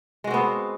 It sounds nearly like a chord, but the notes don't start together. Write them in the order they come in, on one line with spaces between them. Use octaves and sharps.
G#3 F#4 C4 B3